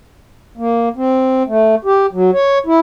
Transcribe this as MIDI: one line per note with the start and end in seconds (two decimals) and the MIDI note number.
0.58 0.89 58
0.96 1.43 60
1.47 1.75 57
1.85 2.06 67
2.13 2.31 54
2.33 2.58 73
2.66 2.80 64